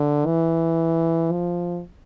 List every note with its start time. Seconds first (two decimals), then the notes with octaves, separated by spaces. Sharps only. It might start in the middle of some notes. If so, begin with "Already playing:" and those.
Already playing: D3
0.26 E3
1.32 F3